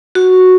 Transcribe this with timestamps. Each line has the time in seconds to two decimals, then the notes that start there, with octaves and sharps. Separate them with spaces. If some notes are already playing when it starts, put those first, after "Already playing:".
0.15 F#4